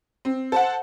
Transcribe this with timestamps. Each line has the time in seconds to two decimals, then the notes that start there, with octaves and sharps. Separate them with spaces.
0.25 C4
0.52 A4 C5 F#5